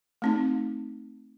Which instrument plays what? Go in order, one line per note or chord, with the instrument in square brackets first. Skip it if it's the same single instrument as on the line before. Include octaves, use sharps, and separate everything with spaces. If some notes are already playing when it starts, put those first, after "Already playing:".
[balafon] A3 C4 D#4